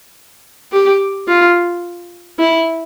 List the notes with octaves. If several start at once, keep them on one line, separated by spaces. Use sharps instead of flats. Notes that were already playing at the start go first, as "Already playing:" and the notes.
G4
F4
E4